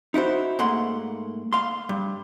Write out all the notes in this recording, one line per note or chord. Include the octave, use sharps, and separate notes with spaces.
D#4 E4 F#4 C5
G#2 A3 A#3 F#5 C6
F5 C6
G2